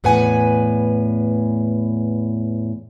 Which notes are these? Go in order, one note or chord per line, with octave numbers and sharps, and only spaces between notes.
E2 A2 B4 F#5 G#5